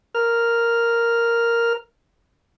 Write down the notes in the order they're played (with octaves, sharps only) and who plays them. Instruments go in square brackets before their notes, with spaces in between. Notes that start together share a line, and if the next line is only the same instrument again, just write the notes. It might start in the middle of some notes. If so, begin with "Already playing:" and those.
[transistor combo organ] A#4 F6